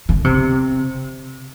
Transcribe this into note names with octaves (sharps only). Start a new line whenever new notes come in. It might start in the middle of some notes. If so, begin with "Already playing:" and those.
D3
C3